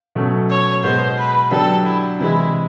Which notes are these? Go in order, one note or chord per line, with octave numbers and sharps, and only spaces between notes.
B2 F#3 A3 C#4
C#5
B2 G#3 B3 C5
B4
D3 F#3 B3 D4 G4 A4
E4
C3 E3 G#3 E4